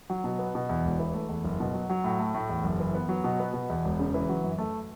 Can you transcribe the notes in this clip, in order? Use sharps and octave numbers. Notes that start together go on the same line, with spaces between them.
F#3
B2
B3
B2
E2
E1
E3
A3
E2
F#1
B2
F#3
F#3
A2
A3
A2
E2
F#1
E3
B3
F#3
B2
B3
B2
E2
E1
C#3
E3
F#3
F#2
A3